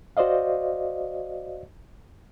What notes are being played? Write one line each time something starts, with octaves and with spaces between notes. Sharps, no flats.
F#4 C5 D5 D#5 F5